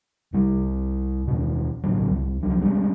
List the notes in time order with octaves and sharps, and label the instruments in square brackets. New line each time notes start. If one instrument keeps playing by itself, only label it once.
[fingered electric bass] C2 G3
D#2 B2
A#1 A2 D3 F#3
C2
C2 F3 F#3
G3 G#3 C4 C#4